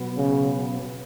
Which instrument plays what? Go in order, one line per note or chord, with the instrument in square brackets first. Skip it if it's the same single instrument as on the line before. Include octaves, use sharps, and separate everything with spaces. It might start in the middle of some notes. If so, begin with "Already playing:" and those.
Already playing: [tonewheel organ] B2 F#3 B3
[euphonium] C#3